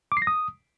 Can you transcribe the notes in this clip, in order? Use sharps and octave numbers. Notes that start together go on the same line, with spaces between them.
D6
C7
A#6
D#6